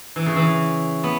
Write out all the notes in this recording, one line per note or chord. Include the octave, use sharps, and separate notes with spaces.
E3
C#3
E3
B3